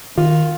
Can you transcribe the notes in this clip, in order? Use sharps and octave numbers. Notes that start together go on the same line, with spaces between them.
D#3 F4